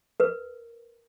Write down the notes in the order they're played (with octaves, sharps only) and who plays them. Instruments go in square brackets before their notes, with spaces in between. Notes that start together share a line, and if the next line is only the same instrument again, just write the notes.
[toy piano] A#4 B4